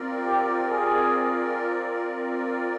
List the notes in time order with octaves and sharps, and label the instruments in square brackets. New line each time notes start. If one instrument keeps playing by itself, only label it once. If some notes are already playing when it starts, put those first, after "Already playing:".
Already playing: [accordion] C4 F4 A#4 D5
[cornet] G4
G#4